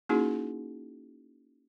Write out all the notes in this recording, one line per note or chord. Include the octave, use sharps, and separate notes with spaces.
A#3 C#4 D#4 E4 F#4 G#4